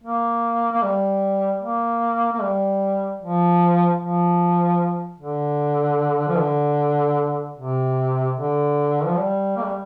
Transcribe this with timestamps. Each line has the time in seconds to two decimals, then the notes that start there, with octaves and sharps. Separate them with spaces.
0.04 A#3
0.72 A#3
0.83 G3
1.62 A#3
2.32 A#3
2.41 G3
3.21 F3
4.00 F3
5.20 D3
6.28 F3
6.38 D3
7.58 C3
8.37 D3
9.04 F3
9.17 G3
9.56 A#3
9.64 G3